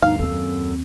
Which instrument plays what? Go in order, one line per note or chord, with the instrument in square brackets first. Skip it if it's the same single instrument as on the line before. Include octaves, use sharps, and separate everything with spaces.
[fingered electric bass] D2 G2 B2 [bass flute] D#4 [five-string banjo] F5
[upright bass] D#2 C4 [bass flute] A4
[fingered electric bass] F#2